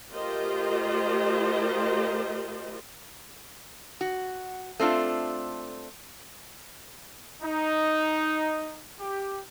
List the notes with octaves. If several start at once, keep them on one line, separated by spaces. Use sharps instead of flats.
A3 F4 G4 A#4 C5 D#5
F#4
A3 C4 D4 F4
D#4
G4